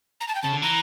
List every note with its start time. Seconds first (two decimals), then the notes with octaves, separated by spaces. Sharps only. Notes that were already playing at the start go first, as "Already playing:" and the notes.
0.21 A#5
0.28 A5
0.35 G5
0.42 C#3 A5
0.53 D3
0.62 E3 A#5